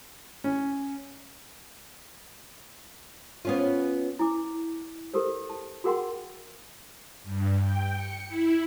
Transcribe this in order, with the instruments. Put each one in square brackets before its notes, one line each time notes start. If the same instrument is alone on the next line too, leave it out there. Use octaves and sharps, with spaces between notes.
[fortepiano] C#4
[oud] B3 C#4 F4
[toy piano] E4 G#5 D6
G4 A4 A#4 C5
A5
F#4 G#4 A#4 F#5 G5 C6
[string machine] G2
G5
C#7
E4